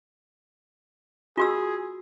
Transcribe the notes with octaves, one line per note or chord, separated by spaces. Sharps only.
F4 F#4 G#4 E6